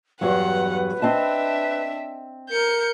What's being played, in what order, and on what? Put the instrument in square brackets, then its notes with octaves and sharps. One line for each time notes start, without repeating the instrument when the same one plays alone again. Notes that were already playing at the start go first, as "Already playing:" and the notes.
[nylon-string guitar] E2 G2 F#3 [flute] B4 [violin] F#5
[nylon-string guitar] C4 D#5 A5 [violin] D4 E5
[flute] A#4 [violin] G6 C#7